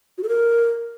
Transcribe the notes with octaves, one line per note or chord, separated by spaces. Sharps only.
F#4
A4
A#4